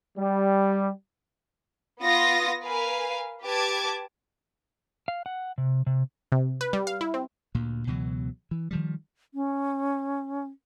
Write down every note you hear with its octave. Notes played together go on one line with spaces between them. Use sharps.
G3
B3 F4 D#6 A#6
A#4 B4 F5 G#5
G4 B4 A5 D6 G#6
F5
F#5
C3
C3
C3
B4
G3
F5
E4
C4
D2 A#2
C#2 B2 E3 F#3
E3
D#3 F3 G3
C#4